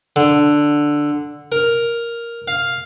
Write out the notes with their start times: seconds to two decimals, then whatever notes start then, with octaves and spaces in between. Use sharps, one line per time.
0.16 D3
1.52 A#4
2.48 F5